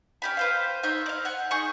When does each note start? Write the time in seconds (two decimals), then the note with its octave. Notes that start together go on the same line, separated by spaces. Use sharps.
0.22 C#4 G4 B5
0.37 B4 C5 F5
0.83 D#4 C5 C#5 E5
1.06 D5 F5
1.25 F#5 G#5
1.51 D#4 G#4 C#6